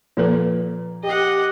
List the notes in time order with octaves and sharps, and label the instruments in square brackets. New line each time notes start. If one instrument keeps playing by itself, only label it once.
[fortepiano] A#2 [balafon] F3 A4 B4
[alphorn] G4 [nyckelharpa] D#5 F#5